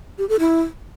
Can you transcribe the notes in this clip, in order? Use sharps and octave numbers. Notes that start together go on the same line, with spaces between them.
G4
A4
E4